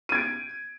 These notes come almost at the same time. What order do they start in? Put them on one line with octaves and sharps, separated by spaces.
D#7 G#6 D7